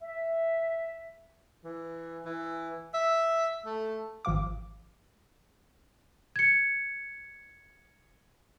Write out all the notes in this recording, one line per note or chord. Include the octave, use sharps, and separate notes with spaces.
E5
E3
E3
E5
A3
G#1 F3 F5 D6
G#6 C#7